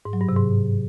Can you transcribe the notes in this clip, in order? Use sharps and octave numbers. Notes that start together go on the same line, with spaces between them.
G#2
F#3
G2
C3
G#2